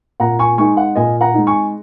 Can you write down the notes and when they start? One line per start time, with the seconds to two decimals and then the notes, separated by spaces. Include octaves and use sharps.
0.20 A#2 F#5 A#5
0.39 G#5 C#6
0.58 G#3 D#4 G#5 C#6
0.77 F#5
0.95 A#2 D#5 G#5
1.21 F#5 A#5
1.34 G#3 D#4
1.47 G#5 C#6